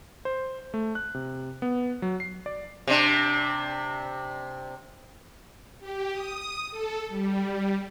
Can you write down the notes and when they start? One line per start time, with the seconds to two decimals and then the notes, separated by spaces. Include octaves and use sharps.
0.25 C5
0.74 A3
0.95 F#6
1.15 C3
1.62 B3
2.02 F#3
2.20 C7
2.46 D5
2.87 C3 D4
5.79 G4
6.11 D#6
6.70 A4
7.08 G3